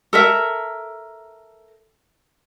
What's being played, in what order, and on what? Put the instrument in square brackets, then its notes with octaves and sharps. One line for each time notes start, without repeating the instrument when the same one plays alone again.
[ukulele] A4 A#4 E5